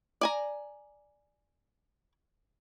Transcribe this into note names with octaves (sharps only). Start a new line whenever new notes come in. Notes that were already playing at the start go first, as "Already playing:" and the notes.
D5 G#5 A#5